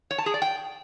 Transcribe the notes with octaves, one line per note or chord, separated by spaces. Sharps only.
C#5
A5
G#4
D5
G5